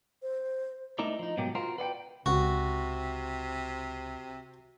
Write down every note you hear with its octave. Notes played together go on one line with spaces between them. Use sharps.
C5
A3 D#4 E4 A#4 D5
F3 D#4
G#2 B2 F#3 A#3 G4
F4 F#4 A#4 C5
B4 D5 F#5 G5
C#2 C3 F#4